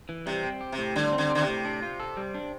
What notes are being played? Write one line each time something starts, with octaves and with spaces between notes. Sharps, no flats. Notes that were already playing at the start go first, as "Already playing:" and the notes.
E3
C3 G3
C4
G4
C3
A2
D3 G3
C4
D3
D3 G4
C3
A2
D4
F4
A4
G3
D4